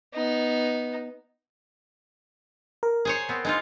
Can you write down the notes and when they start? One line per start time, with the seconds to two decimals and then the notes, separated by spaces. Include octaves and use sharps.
0.14 B3 D#4
2.83 A#4
3.05 G#4 C5 C#5
3.29 B3 C4
3.45 G#3 D#4 F4